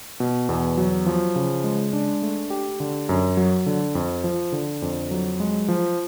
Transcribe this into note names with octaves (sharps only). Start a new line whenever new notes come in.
B2
E2
F#3
F3
C#3
G#3
D4
A3
G4
D3
F#2
F#3
D3
F2
F3
D3
F2
F#3
G#3
F3